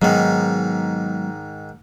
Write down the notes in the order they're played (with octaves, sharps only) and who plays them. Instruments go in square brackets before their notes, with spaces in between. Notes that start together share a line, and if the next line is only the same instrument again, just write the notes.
[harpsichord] G#2 D#3 [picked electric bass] F#3 G#3 B3